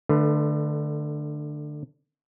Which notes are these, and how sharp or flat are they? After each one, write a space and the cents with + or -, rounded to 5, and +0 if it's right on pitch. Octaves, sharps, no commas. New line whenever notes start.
D3 +20 A3 +0 B4 +0